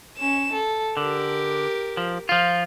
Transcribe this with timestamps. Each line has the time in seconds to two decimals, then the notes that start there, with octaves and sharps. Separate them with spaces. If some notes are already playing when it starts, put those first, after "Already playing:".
0.18 C#4 E7
0.53 A4
0.97 D3 G4 A#4
1.97 F3
2.29 F3 F4